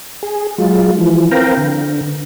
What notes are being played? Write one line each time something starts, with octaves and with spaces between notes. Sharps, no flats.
G#4
F#3 G#3 F4
E3 F3
C4 A#4 B4 F5 G5 A#5
D3